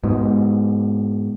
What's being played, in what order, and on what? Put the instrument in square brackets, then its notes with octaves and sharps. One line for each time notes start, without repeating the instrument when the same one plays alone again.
[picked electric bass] G#2 B2